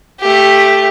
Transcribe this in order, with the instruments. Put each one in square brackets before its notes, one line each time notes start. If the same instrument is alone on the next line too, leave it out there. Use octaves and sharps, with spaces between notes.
[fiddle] A3 G4